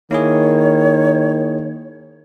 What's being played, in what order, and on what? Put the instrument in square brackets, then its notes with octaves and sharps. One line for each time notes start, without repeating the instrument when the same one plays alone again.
[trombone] D#3 [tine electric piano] A#3 E4 G#4 [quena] C#5